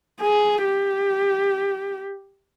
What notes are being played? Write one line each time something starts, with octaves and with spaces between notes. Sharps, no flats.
G#4
G4